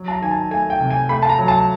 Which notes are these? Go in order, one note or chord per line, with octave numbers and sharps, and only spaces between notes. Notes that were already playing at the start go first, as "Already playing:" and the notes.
Already playing: F#3
A5
A#5
D#3 G#5
A5
A3 G#5
G5
C3
G#5
A3 B5
A5
A#5
F#3
A5